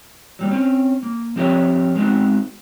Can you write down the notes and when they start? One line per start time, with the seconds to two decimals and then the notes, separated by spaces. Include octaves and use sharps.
0.39 F#3 G3 A#3
0.51 C4 C#4
1.03 A#3
1.36 F3 C4 G4 A#4 C#5 E5
1.95 G#3 B3 C4 D#4 F#4